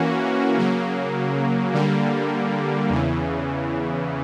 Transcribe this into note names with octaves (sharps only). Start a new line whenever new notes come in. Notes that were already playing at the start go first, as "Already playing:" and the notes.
Already playing: E3 A#3 C#4 F#4
C#3 F#3 A#3
D3 G3 A#3
E2 C#3 E3